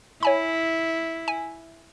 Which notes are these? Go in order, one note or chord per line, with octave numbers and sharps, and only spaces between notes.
E4 C#5 G#5 B5
G#5